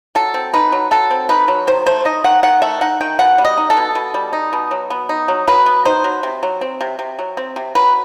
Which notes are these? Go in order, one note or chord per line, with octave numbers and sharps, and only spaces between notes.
F#3 A4
C4
D#4 B4
F#3
F#3 A4
C4
D#4 B4
F#3
D#3 C5
A3 C5
D#4 D#5
D#3 F#5
D#3 F#5
A3 E5
D#4 F#5
D#3 G5
B2 F#5
G3
D#5
D#4
A4
B2
B2
G3
D#4
B2
F#3
B3
D#4
F#3
F#3 B4
B3
D#4 C5
F#3
C3
F#3
C4
C3
C3
F#3
C4
C3
F#3 B4